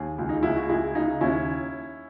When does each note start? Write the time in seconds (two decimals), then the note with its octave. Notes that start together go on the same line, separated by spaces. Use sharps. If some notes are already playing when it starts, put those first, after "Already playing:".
Already playing: D#2 G#4
0.18 C#2
0.29 D#4
0.43 C#2 E4
0.56 F#4
0.69 C#2 E4 G#4
0.95 C#3 D#4
1.21 D#2 C#4 E4